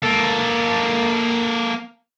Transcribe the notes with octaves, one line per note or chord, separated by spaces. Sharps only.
A#3 A4